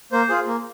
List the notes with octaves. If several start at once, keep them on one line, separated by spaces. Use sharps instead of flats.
A#3 C5
F4 G#4
A#3